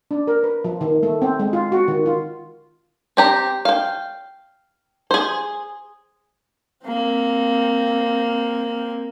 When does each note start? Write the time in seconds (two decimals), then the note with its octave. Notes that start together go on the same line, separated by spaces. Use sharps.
0.11 D4
0.27 A#4
0.43 B4
0.64 F3
0.81 D#3
1.03 A3
1.22 C4
1.40 G#3
1.53 F4
1.72 F#4
1.88 D#3
2.06 F4
3.17 C4 G4 A#5
3.65 F5 G5
5.11 G#4 C5
6.86 A#3 C4